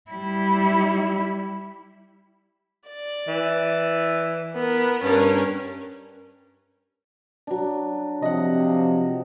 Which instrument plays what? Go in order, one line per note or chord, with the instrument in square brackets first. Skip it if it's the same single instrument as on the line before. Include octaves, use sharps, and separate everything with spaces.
[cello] G3 E4
[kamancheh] D5
[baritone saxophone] E3
[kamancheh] B3 A#4
[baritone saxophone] G2 [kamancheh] C#4 A#4
[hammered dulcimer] F#3 D4
[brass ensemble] C3 F3 [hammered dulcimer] D#5 F#5